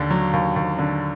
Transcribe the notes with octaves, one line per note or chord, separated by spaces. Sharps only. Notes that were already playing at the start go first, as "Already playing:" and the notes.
Already playing: D#2 D3
F#3
D#2
D#2
D3